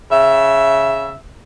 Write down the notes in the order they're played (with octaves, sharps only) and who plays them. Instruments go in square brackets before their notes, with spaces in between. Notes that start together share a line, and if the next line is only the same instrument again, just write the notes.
[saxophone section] C#3 E5